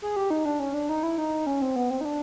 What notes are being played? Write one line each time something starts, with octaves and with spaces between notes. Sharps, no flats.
G#4
G4
D#4
D4
C#4
D4
D#4
E4
D#4
C#4
C4
B3
C4
D#4
D4